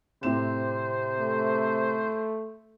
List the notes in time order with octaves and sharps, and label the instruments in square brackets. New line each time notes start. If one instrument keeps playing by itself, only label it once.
[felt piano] A2 C4 E7 [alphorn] C3 [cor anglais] C5
[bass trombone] A3